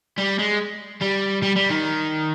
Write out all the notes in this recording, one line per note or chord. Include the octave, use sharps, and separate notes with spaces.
G3
G#3
G3
G3
G3
D#3